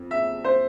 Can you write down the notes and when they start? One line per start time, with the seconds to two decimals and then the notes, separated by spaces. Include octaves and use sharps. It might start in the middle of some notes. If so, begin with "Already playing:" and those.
Already playing: F2
0.11 E5
0.44 C5